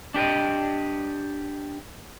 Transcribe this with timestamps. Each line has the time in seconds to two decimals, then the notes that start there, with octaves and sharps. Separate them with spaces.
0.14 D4 G4 D5 D#5